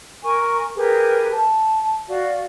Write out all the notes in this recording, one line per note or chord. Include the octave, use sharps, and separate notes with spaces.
A#4 G#5 C#6
G4 G#4 A#4 B4
A5
F#4 D5 F5